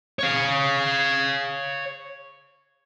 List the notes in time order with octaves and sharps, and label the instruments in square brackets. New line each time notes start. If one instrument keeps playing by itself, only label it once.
[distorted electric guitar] C#5 F5